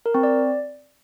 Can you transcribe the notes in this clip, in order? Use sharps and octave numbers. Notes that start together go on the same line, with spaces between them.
A#4
C4
D5